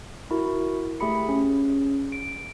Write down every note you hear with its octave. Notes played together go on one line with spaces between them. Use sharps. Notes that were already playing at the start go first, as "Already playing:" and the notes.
E4 F#4 A#4
A3 G4 G#4 B5 C#7
C#4 G#4
D7